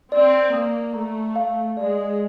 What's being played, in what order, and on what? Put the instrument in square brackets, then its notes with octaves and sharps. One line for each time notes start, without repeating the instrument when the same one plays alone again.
[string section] C4 [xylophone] D5
[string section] A#3 [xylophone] D#6
[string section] A3 [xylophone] A#5
[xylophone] F5
[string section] G#3 [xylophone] D5